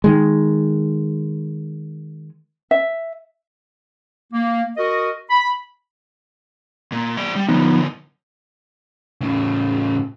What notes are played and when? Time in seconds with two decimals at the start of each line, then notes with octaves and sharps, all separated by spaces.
0.04 D#3 G#3
2.71 E5
4.33 A#3
4.77 F#4 A#4 D#5
5.30 B5
6.92 A#2
7.17 F#3 D5
7.36 G3
7.48 D3 F3 F#3 B3 D#4
9.21 A2 C#3